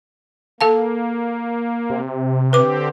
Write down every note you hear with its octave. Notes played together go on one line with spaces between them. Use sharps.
A#3 A4 F5 A5
C3
D3 C4 G4 B4 D6